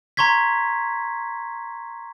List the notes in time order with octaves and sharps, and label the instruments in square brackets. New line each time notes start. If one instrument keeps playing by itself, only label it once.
[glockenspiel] A#5 C6 C#6 G#6 B6